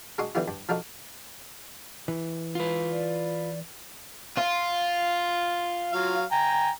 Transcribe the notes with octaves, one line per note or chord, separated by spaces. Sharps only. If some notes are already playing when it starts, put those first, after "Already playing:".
G#3 D4 F#4 C6 C#6 D#6
D3 E3 G3 B3 E4 F4
G2
F3 D4 D#4 F#4 A4
E3
F4 B4
D5
F4
F#3 F5
G5 G#5 A#5